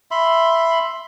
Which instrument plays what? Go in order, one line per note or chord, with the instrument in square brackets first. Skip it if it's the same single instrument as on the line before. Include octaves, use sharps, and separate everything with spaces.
[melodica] E5 B5 C6